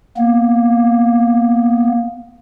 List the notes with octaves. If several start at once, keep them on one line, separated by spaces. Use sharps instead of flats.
A#3 B3